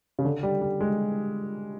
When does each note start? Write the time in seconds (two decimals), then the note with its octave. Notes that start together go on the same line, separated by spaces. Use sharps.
0.19 C#3
0.25 D3
0.43 G3
0.62 G3
0.81 G#3